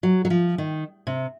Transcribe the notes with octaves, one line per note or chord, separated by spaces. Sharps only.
F#3
F#3
F3
D#3
C3